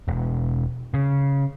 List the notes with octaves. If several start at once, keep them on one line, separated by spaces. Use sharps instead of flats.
E1
C#3